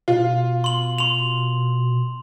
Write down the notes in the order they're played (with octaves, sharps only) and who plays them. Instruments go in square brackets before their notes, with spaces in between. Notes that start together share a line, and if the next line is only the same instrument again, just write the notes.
[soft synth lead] B2 [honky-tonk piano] F4
[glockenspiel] C6 F#7
C6 F7